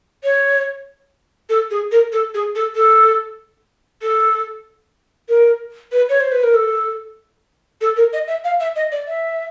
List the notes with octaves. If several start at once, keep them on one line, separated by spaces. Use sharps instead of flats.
C#5
A4
G#4
A#4
A4
G#4
A4
A4
A4
A#4
B4
C#5
C5
B4
A#4
A4
A4
A#4
D#5
E5
F5
E5
D#5
D5
E5